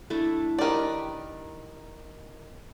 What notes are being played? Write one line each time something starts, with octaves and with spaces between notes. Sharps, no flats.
A3 D4 E4
D#3 G4 A#4 B4 D5